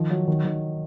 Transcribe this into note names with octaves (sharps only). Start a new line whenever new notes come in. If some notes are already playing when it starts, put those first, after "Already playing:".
Already playing: D#3 F3
F#3
D#3
D#3